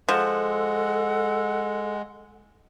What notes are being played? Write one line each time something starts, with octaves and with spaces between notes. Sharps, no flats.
F3 G#3 A4 F#5